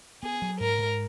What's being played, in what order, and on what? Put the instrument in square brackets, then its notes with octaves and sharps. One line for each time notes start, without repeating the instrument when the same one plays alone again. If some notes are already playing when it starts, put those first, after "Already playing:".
[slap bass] B3 [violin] G#4
[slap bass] F#3
[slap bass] G#2 [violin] A#4
[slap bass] G#2